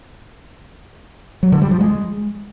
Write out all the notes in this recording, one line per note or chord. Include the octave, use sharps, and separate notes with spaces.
F#3
D3
G3
F3
G#3